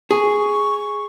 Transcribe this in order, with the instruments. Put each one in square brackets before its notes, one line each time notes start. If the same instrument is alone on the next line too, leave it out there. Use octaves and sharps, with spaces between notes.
[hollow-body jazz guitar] G#4 [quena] C#6